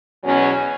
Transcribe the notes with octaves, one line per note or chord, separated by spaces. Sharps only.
E2 B2 F#3 C#4